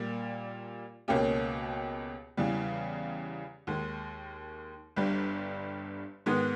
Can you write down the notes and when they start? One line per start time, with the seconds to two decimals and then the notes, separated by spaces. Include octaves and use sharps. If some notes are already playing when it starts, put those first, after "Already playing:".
Already playing: A#2 G3 A#3
1.08 C#2 B2 A#3 C#4 G4
2.37 E2 C#3 E3 G3
3.67 D#2 D#3 G#3
4.96 G1 G2 G3
6.26 G#2 D#3 G#3 B3